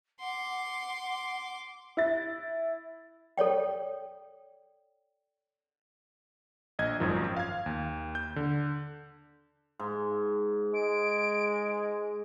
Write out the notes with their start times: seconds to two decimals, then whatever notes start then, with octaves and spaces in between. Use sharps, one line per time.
0.19 F#5 C6 D6
1.97 E4 A6
3.38 A4 C#5 D5 G5
6.79 A#1 D#5 G#6
7.00 G#1 F#2 D#3 F3
7.37 F5 G#6
7.66 D#2
8.15 G6
8.36 D3
9.79 G#2
10.74 G#3 D7